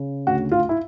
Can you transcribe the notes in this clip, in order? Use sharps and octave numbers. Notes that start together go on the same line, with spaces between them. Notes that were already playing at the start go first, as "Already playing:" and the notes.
Already playing: C#3
D2 F#4
F4
E4